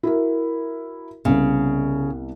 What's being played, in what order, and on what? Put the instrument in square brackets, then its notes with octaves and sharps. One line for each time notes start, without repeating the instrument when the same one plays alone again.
[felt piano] E4 F#4 A#4
[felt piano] C2 B3 [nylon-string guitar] C#3